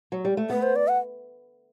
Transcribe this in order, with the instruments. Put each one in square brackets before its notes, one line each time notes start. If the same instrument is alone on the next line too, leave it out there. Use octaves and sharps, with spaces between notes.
[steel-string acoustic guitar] F#3
G3
A3
[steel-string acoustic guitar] B3 [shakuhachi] B4
[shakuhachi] C5
D5
F#5